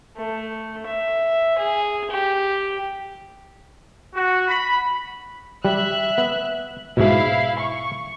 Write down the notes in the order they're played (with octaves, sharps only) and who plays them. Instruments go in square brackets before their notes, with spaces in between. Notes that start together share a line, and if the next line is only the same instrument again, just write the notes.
[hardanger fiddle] A3
E5
G#4
G4
[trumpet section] F#4
B5
[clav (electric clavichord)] G3 [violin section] E5 F#6
[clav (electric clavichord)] B3
[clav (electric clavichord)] G#2 B2 [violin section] E4 E5 F5
[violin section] C#6